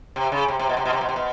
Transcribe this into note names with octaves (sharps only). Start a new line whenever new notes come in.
C3
C#3
C3
C3
B2
C3
B2
C3
B2
C3
B2